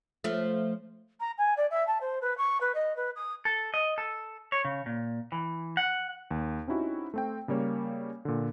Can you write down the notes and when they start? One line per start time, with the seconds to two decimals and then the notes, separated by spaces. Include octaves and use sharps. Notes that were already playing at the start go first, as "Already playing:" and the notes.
0.24 F3 A3
1.20 A#5
1.38 G#5
1.56 D5
1.70 E5
1.86 A5
2.00 C5
2.21 B4
2.37 C#6
2.60 B4
2.74 D#5
2.96 B4
3.15 D#6
3.45 A4
3.74 D#5
3.98 A4
4.52 C#5
4.65 C#3
4.86 A#2
5.32 E3
5.77 F#5
6.31 D#2
6.67 C4 C#4 D#4 E4 F#4 G4
7.14 A3 C4 G5
7.48 C#3 G3 A#3 C#5
8.25 A#2 D3